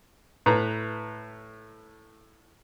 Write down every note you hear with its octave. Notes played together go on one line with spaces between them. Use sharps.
A2 B4 A#5